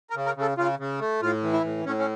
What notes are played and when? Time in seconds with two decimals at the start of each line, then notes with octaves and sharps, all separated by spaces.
0.10 A#4
0.16 C#3
0.26 A#4
0.37 C#3 A4
0.58 C#3 F4
0.79 C#3
1.00 A3
1.22 A2 F4
1.43 E3
1.53 E4
1.64 A2
1.85 A2 C#4
1.99 C#4